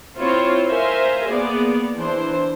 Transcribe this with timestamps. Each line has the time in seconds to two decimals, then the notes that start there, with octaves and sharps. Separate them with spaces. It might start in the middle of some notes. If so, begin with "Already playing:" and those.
0.17 C4 E4 F4 C5 C#5
0.69 A#4 C5 E5 F5 G#5 C6
1.28 A#3 B3 G#4 D5
1.97 E3 D4 C5